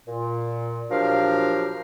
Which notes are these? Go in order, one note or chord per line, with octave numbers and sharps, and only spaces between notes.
A#2
F3 F#3 D4 G4 A#4 F5